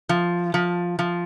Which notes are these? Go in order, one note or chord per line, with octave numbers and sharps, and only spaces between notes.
F3
F3
F3